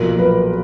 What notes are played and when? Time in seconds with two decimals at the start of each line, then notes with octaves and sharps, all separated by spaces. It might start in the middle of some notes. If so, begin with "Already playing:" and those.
Already playing: B1 A#2 F3 A#4
0.19 B4